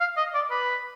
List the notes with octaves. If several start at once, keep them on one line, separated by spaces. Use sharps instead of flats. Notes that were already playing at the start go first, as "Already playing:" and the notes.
F5
D#5
D5
B4